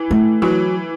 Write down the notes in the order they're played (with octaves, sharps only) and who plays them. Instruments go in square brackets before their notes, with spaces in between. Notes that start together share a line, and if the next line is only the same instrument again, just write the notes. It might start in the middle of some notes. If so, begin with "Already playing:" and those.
Already playing: [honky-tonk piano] E3
[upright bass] A3
[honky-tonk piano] E3 [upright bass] F#3